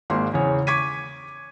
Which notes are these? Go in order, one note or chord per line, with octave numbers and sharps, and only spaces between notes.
G#1 G#3 A#3 C6
E2 C#3 C#5
C#6 D6 G#6 B6 D#7